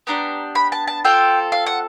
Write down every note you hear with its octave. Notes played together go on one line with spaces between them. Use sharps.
B3 D4 G4 A#5
B5
A5
A5
C4 F4 A4 G5
F5
F#5